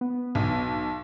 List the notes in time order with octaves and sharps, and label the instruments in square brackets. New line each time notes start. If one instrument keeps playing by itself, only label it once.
[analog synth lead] B3
[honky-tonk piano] B1